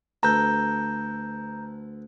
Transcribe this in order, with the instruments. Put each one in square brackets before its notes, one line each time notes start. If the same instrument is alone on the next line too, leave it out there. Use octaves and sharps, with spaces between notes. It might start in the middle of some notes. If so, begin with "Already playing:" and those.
[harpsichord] D2 A4 B4 [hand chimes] A#5 G6